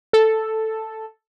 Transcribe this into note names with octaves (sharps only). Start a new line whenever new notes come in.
A4